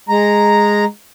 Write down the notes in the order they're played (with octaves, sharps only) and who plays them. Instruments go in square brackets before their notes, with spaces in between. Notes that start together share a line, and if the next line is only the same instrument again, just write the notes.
[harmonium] G#3 A#5